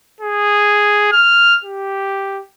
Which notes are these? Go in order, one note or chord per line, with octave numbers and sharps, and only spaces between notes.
G#4
F6
G4